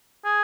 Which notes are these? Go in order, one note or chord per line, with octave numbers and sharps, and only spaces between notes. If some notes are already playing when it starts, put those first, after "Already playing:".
G#4